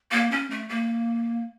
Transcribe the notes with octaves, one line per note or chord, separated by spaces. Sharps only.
A#3
C#4
A3
A#3